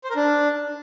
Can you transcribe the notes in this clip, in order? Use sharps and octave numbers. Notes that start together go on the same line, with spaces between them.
C5
A#4
D4